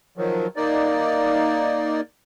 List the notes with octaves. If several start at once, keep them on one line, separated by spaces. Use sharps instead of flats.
D#3 F3 F#3
A#3 D#4 D5